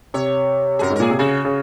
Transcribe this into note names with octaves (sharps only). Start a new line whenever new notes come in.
C3 C#5
F#2 G#4 A#4
G#2
A#4
A#2 G#4
C3
C#3 F#4
C#3